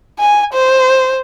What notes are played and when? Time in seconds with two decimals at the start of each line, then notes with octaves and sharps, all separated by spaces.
0.20 G#5
0.53 C5